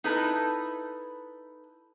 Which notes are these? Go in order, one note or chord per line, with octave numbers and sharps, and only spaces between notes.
D#4 E4 A4 B4